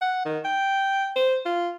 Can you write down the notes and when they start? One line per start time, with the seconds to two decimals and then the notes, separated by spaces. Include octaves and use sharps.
0.01 F#5
0.25 D#3
0.44 G5
1.16 C5
1.45 F4